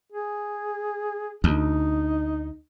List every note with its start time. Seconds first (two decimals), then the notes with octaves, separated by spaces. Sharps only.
0.12 G#4
1.44 D2 D#4